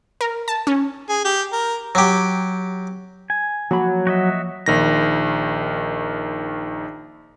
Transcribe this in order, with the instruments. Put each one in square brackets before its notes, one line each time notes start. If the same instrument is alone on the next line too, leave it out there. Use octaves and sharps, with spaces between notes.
[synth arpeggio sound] A#4
A5
C#4
[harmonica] G#4
G4
A#4
[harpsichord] F#3 G4
[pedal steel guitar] G#5
[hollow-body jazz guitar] F3 A#3 B5 [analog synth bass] F#3
[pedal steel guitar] F#4 D#5 E5
[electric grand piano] A#1 D#3 A#6